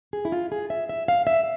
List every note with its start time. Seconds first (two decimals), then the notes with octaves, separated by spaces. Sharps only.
0.13 G#4
0.25 E4
0.32 F4
0.52 G#4
0.70 E5
0.89 E5
1.08 F5
1.27 E5